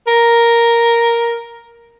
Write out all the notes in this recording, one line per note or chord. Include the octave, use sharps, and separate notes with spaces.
A#4